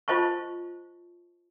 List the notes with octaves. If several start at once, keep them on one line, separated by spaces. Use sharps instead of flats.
F4 C5 D#5 A5 C#6